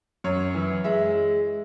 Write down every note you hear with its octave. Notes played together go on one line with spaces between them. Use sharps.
F#2 C#5
E3
G#3 E5